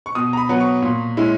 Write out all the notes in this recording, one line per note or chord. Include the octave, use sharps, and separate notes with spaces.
C#6
B2 D#6
A#5
B5
F#3 B3
C#6
A#2
G#3 C#4 E4